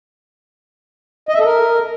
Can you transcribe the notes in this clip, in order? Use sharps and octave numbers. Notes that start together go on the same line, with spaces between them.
D#5
E5
A4
A#4